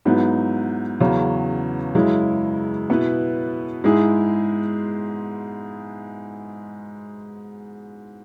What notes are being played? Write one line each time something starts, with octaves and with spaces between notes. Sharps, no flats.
G#2 F#3 B3 E4
E2 C#3 F#3 C#4
F#2 C#3 G#3 E4
B2 B3 E4 B4
G#2 G#3 E4 G#4